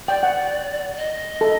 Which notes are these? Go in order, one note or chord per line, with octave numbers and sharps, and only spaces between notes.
D5 G5
F#5
D#5
A4